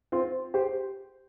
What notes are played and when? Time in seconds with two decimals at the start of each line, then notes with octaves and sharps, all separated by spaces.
0.12 C4 F4
0.54 G4 C5